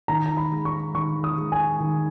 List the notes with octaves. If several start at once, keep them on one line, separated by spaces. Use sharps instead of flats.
D#3 A#5
A#5
B5
G#3
C#6
D#3 C#6
D#6
G#3
G#5
D#3